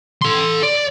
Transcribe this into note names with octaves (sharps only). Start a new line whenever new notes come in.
A4 C6
D5